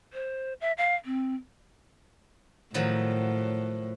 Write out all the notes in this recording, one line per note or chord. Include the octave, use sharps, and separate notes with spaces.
C5
E5
F5
C4
A2 D#3 F3 F#3